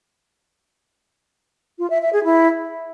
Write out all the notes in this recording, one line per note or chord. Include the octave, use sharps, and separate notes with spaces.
F4
E5
E5
G#4
E4